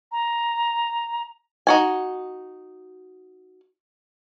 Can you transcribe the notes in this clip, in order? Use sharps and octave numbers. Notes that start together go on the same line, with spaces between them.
A#5
D#4 F#4 G#5